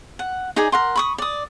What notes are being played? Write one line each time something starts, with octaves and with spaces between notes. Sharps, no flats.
F#5
D#4 G#4 D5 G#5
A#4 F#5 C6
B5 C#6 D#6
D5 D#6